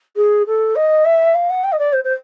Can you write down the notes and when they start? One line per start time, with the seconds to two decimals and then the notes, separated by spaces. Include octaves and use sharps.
0.16 G#4
0.47 A4
0.76 D#5
1.05 E5
1.35 F5
1.50 F#5
1.64 G5
1.72 D#5
1.79 D5
1.93 C5
2.04 C5